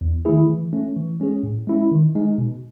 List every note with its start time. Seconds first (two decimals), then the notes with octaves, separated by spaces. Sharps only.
0.01 E2
0.25 D#3 A3 E4 G#4
0.50 E3
0.73 A3 C#4
0.96 E3
1.20 G#3 C#4 G#4
1.43 A2
1.67 G#3 C#4 E4
1.92 D#3
2.15 G#3 D#4
2.38 B2